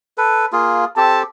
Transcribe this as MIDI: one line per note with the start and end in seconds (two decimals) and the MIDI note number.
0.18 0.46 69
0.18 0.46 71
0.52 0.85 58
0.52 0.85 65
0.52 0.85 68
0.97 1.23 60
0.97 1.23 67
0.97 1.23 69
0.97 1.21 81